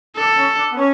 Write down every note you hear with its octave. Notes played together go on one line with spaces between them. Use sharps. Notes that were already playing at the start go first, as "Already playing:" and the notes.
D4 A4
C#4
D4
B3
C#4